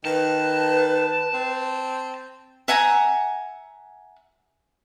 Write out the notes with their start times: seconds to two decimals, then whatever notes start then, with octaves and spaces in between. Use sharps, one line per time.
0.05 D#3 B4 A5
1.34 C4
2.68 E5 F#5 G#5 A#5